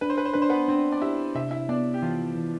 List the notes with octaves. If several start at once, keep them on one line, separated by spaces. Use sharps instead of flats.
D4 B4
C5
B4
C5
D4 B4
C5
B3 B4
C4 D4 C5
D5
E4 G4 E5
C3 E5
E4 E5
B3 D4 D5
G4
E3 F3 F4
E3